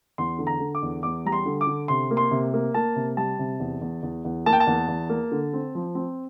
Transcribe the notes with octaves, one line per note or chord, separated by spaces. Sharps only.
E2 C6
D3
A#5
D3
D6
E2
E2 D6
G3 A#5
C6
D3
D6
D3
C3 C6
A#3
C6
C3
A#3
A#3 A5
C3
G3 A5
C3
E2
E2
E2
E2
A#3 A5
G5
A5
E2
E2
A#3
D3
C4
F3
C4